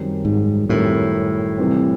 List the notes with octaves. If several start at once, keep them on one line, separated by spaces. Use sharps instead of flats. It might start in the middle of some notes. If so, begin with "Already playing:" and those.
Already playing: F#2 D#3 G3 C4
G#2
F#2 A2 D#3 G3 C4
C3 E3 G3 C4